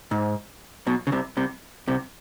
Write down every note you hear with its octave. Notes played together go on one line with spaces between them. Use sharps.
G#2
B1 B2
C#3
C2 C3
C2 C3
C2 C3